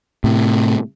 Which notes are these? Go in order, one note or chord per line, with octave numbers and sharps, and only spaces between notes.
A2 C3